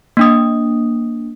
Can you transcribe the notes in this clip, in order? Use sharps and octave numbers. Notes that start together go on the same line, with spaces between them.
A#3 D4 D#6